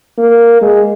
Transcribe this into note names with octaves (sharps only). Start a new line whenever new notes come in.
A#3
G#3